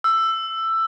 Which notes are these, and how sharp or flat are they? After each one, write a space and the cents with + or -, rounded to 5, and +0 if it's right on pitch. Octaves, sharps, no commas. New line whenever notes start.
E6 +10